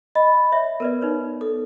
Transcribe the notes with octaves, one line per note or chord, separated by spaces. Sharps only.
D#5 B5
C#5 E5
B3 A#4 B4 D5
D#4 B4 C#5
A4 D#6